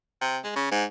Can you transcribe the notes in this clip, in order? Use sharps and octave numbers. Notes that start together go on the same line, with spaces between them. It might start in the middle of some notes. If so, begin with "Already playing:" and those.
C3
G#3
C#3
G#2